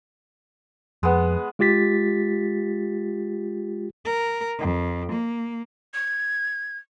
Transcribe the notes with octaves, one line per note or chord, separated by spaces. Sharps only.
F2 G#3 B3
G#3 F4 G4 A6 B6
A#4
F2
A#3
G#6